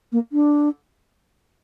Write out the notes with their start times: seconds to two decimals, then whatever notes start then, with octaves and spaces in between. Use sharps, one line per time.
0.12 A#3
0.32 D4